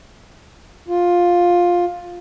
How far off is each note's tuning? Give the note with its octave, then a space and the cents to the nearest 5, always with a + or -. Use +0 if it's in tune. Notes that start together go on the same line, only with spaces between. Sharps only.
F4 +10